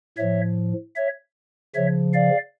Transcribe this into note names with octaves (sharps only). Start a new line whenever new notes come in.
A2 F3 C#5 E5
C#5 E5
C#3 F3 C#5 E5
D5 F5